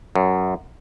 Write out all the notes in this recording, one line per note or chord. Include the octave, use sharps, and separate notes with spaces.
F#2